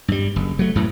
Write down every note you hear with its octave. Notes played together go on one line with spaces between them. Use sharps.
G2 G3
F#1
F#3 A3
F#2 A2 E3